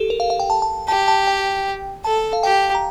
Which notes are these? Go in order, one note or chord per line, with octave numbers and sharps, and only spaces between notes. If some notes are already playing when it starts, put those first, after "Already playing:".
Already playing: G4 A4
A#4
F5
F5
G5
A5
A5
G4 A5
A5
G5
A4 A5
F5
G4 G5
A#5